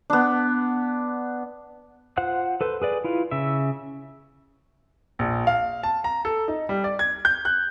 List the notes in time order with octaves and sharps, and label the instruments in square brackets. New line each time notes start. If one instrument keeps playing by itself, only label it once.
[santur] B3 D4
[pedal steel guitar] F4 C5 F#5 F#6
A4 B4 C5
G#4 B4 D5
E4 F4 B4
C#3 E5
[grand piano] A#1
F5
A5
A#5
A4
D#4
G3
D5
G#6
G6
F#6